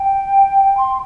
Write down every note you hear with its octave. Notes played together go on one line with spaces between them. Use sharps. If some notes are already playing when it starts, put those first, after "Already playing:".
Already playing: G5
C6